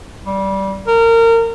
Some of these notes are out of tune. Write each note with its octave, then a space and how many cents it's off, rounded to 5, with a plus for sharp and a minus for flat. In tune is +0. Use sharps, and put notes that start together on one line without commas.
G3 -15
A#4 -25